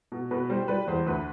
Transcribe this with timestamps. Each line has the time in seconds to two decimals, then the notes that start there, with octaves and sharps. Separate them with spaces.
0.12 B2
0.31 B2 B4
0.50 G3 C5
0.68 G3 B4 D5
0.87 E2 C5
1.06 D2 B4